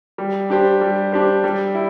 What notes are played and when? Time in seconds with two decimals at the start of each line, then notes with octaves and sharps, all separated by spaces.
0.18 G3
0.50 D4 G4 C5
0.81 G3
1.12 D4 G4 C5
1.44 G3
1.75 E4